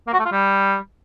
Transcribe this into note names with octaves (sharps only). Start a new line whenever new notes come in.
A#3
F#4
A3
F4
G3